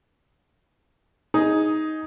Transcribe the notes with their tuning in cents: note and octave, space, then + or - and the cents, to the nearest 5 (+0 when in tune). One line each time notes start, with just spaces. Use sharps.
D#4 +10 G#4 +0